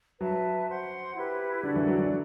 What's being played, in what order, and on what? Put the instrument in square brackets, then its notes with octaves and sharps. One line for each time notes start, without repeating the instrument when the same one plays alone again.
[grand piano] F#3 [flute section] B4 E5 A5
[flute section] C5 F#5 C6
E4 G4 B4
[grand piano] D3 [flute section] F#4 A4 D5
[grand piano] E3
F#3
E3